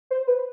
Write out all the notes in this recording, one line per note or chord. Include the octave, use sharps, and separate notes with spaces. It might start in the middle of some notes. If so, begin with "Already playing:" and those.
C5
B4